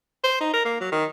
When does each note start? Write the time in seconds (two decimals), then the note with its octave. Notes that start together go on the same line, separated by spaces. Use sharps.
0.24 C5
0.41 D#4
0.53 A#4
0.65 A#3
0.81 F#3
0.92 D#3